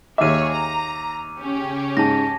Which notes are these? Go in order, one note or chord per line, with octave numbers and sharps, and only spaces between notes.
D#2 G#4 C#5 E5 D6 D#7
A#5
C#3 C#4 G4
G#2 A5 A#6